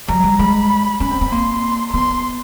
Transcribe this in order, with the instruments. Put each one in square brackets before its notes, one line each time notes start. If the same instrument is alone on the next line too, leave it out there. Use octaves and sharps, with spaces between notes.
[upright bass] F#3 [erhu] A#5
[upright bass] G3
[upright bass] G#3 [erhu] B5
[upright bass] C#4 [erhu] B5
[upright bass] C4
C4
[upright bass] A#3 [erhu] C6
[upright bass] B3 [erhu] C6